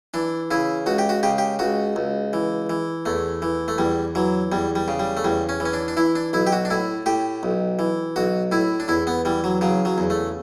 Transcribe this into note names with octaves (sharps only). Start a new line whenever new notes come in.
E3 D4
C#3 E4
C#2 F#4
G4
F#4
C#3 G4
G4
C#2 F#4
C#2
E3
E3
E2 A3
E3
A3
E2 G3
E3 F#3
E2 G3
G3
C#3
G3
A3
E2 G3
C#4
E3
C#4
D4
D4
E3 E4
D4
B1 E4
G4
F#4
D4
A2 E4
A2 G4
B1
E3
B1 F#4
A2 E4
D4
E2 E4
B3
E3 G3
F#3
C#3 F#3
F#3
E2
A3